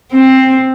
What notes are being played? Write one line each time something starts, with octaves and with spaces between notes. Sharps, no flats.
C4